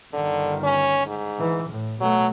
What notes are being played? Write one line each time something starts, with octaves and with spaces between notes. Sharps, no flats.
G1 D3 D#3
C#4
G#2
E3
A2
B2 F#3 A3